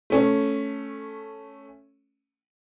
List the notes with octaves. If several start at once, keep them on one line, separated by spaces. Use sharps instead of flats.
A3 C#4